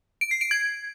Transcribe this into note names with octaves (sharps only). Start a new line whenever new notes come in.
D7
C7
D7
G#6